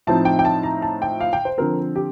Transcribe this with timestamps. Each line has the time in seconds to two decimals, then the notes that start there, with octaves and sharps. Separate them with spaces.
0.07 A2 F3 C4 D#4 A5
0.25 G5
0.39 G5
0.45 A5
0.63 A#5
0.82 A5
1.02 G5
1.21 F5
1.33 G5
1.45 C5
1.58 D3 F3 C4 A#4
1.96 G4